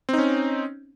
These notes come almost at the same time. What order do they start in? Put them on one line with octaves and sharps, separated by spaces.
C4 D#4 C#4